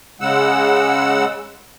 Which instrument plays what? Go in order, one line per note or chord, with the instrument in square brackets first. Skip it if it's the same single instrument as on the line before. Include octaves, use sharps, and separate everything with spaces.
[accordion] C#3 G#3 F#5 E6